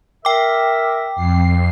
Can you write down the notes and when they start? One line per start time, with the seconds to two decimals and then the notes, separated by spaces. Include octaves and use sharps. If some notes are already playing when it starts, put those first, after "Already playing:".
0.25 A#4 E5 G5 D6
1.15 F2 C7